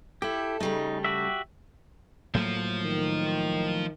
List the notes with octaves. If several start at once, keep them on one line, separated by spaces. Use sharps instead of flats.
E4 G4 A4
C#3 G3 A3 D#4
F#4 G4 E5
A2 F3 F#3 A#3
D#3